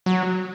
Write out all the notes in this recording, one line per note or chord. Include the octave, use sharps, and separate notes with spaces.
F#3